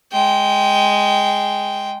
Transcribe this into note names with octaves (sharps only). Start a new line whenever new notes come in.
G#3 G5